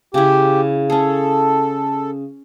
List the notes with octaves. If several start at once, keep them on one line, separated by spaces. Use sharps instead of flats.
C#3 E4 G4
C#4 G#4 A4